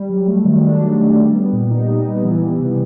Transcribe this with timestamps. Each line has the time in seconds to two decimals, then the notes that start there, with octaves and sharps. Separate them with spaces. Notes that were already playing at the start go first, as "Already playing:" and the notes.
Already playing: G3
0.10 F#3
0.27 A3
0.45 D#3
0.63 D4
0.81 F#3
0.99 A3
1.16 G3
1.35 B3
1.53 A#2
1.70 D#4
1.88 G3
2.06 B3
2.24 E3
2.42 G3
2.60 C3